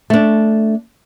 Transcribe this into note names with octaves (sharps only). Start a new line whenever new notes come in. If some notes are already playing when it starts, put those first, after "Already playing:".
A3 D4